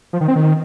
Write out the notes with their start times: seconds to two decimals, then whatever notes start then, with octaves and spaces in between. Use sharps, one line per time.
0.13 F3
0.21 D#3
0.28 C4
0.36 D#3